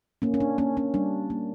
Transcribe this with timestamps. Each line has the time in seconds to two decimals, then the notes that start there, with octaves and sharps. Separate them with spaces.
0.22 A#3 C#4
0.34 C#4
0.40 D4
0.58 A#3 C#4
0.77 C#4
0.94 G3 D4
1.30 A#3